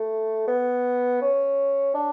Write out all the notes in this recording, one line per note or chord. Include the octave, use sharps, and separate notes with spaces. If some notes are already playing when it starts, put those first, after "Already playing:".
Already playing: A3
B3
C#4
D4